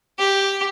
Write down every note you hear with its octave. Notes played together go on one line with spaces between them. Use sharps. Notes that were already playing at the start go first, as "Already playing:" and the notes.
G4